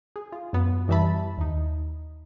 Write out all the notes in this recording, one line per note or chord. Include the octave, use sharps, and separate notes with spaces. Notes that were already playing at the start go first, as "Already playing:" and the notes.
G#4
F4
F#2 B3
F#2 E3 G3 E5 A5 B5
D#2 D#4